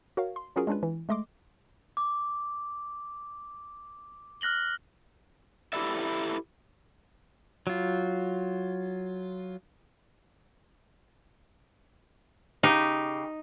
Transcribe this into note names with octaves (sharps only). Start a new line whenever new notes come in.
F#4 A#4 C#5 F5
C6
F#3 C#4 F4 F#4 G#4 A#4
G#3 C#4 D4 F4 B4
E3
G#3 A3 D#5 C6 D6
D6
F6 F#6 A#6 F#7 G7
E4 G4 A4 B4 D5 E5
F#3 F4
C#3 D#4 G4